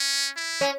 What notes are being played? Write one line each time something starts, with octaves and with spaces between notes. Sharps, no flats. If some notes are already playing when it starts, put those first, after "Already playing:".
Already playing: C#4
E4
C#4